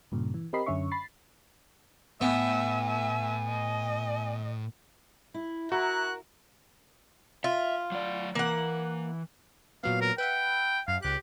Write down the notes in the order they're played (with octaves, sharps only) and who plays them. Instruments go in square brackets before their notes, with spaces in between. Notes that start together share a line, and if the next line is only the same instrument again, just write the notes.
[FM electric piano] G2 A#2 C#3
E3
C4 G4 A#4 D#5 B5 C7
F#2 D3 C#4 E5 C#6
B5 A6 C7
[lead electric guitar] A2 [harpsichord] B3 [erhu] E5 [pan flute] G#5
[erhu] E5
D#5
[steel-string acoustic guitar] E4
[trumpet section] E4 A#5 [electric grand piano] F#4 [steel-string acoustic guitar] A#4 [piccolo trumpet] F#6
[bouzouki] F4 [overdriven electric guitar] E5
[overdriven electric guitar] F#3 D5
[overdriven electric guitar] E3 [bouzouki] A#3 F#5
[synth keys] A#2 F#3 B3 [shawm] F5
[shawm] A#4
[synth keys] B4 E5 F#5 [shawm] G5
[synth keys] F#2 [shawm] F5
[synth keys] C#2 F#6 [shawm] G4